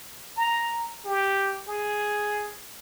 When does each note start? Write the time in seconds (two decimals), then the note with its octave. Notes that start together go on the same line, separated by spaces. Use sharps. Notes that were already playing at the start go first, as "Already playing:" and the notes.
0.37 A#5
1.05 G4
1.68 G#4